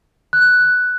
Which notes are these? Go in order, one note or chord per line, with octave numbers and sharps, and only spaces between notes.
F#6